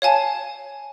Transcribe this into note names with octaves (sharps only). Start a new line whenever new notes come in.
C#5 F5 G#5 A5